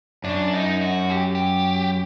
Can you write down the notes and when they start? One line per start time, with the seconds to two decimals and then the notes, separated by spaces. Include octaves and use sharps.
0.24 F#2 D4
0.53 D#4
0.81 F#4
1.10 G4
1.35 G4